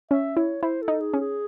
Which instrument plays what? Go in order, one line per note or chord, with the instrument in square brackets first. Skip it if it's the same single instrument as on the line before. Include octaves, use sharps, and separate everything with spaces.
[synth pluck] C#4 [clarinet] E5
[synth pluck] E4 [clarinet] C#5
[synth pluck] E4 [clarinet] C5
[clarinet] A4
[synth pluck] D#4
[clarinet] G#4
[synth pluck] C#4
[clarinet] G#4